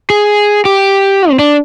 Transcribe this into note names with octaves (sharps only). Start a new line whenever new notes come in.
G#4
G4
C4
D4